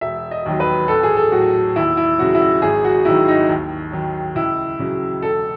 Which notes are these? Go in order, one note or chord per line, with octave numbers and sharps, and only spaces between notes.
E1 E5
D#5
D#2 D#3 F#3
B4
A1 A4
G#4
A4
A2 F#3 F#4
D#2 E4
E4
C#3 F#3 F#4
E4
F#4
G#1 G#4
F#4
G#2 D#3 F#3 E4
D#4
D#2
D#3 F#3
C#2 E4
C#3 F#3
E1 A4